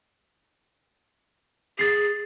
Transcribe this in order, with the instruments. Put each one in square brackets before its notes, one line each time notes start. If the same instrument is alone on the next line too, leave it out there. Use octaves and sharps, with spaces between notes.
[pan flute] G#4 [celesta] A6 C7